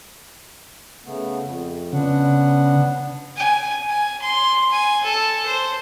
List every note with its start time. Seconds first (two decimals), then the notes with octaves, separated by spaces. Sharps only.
1.05 C#3 A3 B3
1.41 F2
1.93 C#3 B3 D4 F#5
3.37 G#5
3.90 G#5
4.22 C6
4.72 G#5
5.04 A4
5.46 C5